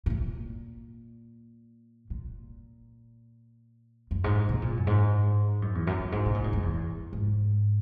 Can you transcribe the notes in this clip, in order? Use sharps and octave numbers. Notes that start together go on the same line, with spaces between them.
G#2
A#2
A#2
F#2
G#2
B2
A#2
F#2
G#2
F#2
E2
F#2
F#2
G#2
B2
A#2
G#2
F#2
E2
G#2